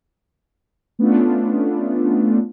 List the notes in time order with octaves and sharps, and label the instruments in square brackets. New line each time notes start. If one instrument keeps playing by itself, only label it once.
[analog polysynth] A3 B3 C#4 D4 F4